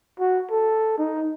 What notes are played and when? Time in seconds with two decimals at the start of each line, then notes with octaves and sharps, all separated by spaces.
0.20 F#4
0.51 A4
0.98 D#4